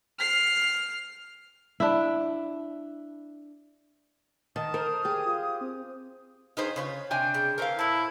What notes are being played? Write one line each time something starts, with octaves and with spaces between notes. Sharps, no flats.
F6 C7
D4 E4
D#3 D#5 A5 D#6
A#4 C5 F6
G4 G#4
F4
C4
D#3 D#4 G#4 B4 C5 F5
C#3 F4 B4 C#5
C3 D4 G5 G#5
C#3
E3 A3 A#4 C5 F5
A2 E4 A5